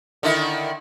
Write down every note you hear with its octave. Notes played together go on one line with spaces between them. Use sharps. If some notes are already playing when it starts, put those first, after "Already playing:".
D3 D#3 E4